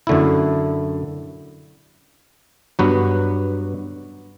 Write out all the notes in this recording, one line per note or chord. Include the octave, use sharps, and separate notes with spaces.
F#2 D3 A3 E4
G2 F#3 B3 F#4 B4